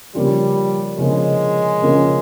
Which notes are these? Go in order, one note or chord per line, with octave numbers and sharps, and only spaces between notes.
C#3 F3 G3 A#3 C#4 F4
C#3 F3 G#3 A#3 C#4 F4
C#3 F3 A#3 C#4 F4